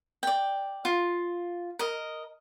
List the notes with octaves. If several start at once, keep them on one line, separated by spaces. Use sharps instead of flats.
D5 G5
F4
A#4 D#5